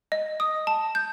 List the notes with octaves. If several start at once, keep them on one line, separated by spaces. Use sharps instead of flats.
D#5
D#6
A5
G6